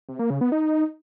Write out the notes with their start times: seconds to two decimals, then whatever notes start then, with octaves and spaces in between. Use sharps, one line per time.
0.09 C3
0.19 A#3
0.30 C#3
0.41 B3
0.52 D#4